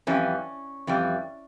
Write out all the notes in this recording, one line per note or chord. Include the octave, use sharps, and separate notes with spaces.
F2 E3 G3 C#4
F2 E3 G3